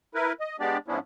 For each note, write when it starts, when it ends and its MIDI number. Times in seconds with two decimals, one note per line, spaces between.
0.15 0.33 64
0.15 0.33 70
0.15 0.33 71
0.40 0.57 75
0.60 0.78 56
0.60 0.78 59
0.60 0.78 62
0.60 0.78 67
0.60 0.78 74
0.88 0.99 44
0.88 0.99 53
0.88 0.99 59
0.88 0.99 61
0.88 0.99 62
0.88 0.99 64